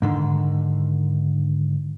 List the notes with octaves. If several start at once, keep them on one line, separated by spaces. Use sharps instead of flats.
G#2 D3 D#3